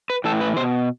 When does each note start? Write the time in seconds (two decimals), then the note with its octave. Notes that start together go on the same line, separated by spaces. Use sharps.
0.10 B4
0.24 A2 E3 A4
0.41 B4
0.56 B2 C5